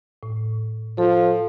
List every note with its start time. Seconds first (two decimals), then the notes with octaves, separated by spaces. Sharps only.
0.23 A2
0.98 F3 A4